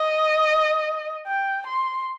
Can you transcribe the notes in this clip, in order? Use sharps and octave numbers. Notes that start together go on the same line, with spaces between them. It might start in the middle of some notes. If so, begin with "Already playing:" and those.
Already playing: D#5
G5
C6